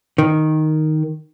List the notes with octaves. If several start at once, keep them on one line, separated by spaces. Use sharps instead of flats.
D#3